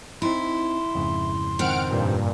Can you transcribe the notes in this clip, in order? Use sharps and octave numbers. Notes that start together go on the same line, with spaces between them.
C4 D#4 E4 C6
F2 G#2 C#3
D#3 C4 F#5 F6 D7
G2 A#2